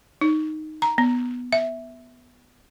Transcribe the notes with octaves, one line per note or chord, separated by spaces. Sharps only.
D#4
A#5
B3
E5